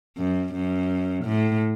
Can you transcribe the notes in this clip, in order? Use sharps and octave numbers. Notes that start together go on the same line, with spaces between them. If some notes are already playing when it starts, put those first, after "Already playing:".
F#2
F#2
A2